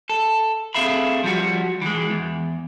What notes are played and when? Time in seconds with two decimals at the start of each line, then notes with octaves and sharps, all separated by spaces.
0.09 A4
0.75 C4 G#4 A4 E5 F5 B5
1.24 F3 G3 F#4
1.82 E3 G#3
2.10 E2